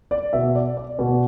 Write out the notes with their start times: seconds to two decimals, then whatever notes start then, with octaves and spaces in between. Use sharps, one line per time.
0.11 D5
0.33 B2 E5
0.55 D5
0.77 D5
0.98 B2 D5